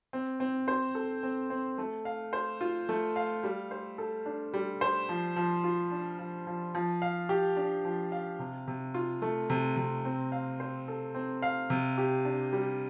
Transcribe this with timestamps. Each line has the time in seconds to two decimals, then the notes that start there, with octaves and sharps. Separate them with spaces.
0.13 C4
0.40 C4
0.68 C5
0.95 A4
1.23 C4
1.50 C4
1.78 A3
2.05 F5
2.33 C5
2.61 F4
2.89 A3
3.16 F5
3.44 G3
3.71 C5
3.98 A4
4.26 D4
4.53 G3
4.81 C5
5.09 F3
5.36 F3
5.64 F4
5.91 D4
6.19 F3
6.47 F3
6.75 F3
7.02 F5
7.29 G4
7.56 D4
7.85 F3
8.12 F5
8.39 C3
8.68 C3
8.94 F4
9.22 A3
9.50 C3
9.77 C3
10.05 C4
10.32 F5
10.60 C5
10.88 A4
11.15 C4
11.42 F5
11.70 C3
11.98 G4
12.25 D4
12.53 G3